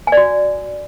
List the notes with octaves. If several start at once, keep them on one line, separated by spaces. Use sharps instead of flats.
G#5
D5
F#4